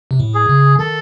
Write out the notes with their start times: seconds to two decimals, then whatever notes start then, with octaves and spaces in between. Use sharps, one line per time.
0.11 C3
0.20 A2
0.35 G#4
0.49 C#3
0.79 D#3 A4